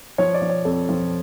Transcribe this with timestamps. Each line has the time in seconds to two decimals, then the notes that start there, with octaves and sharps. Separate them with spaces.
0.18 F3 C#5
0.34 D5
0.41 F3
0.50 C#5
0.65 F2 A4
0.89 F3